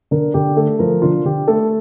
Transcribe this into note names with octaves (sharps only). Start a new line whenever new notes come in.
D3 A#4
D3 G4
A3 A4
F3 A#4
D3 F4
D3 G4
A3 A4